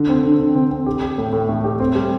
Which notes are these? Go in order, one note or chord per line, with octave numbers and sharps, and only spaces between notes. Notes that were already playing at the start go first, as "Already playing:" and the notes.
Already playing: D3
C4
D3
D3
C4
C4
G4
G4
A2
A2
A3
G4
C4
G3